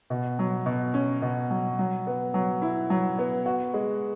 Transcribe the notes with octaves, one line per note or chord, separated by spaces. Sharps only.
B2
F#3
B2
C#4
B2
F#3
F#3
B3
F#3
E4
F#3
B3
F#4
G#3